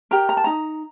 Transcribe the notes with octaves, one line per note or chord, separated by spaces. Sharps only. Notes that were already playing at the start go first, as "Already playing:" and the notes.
G4 A#4 A#5
A#5
A5
D#4 A#5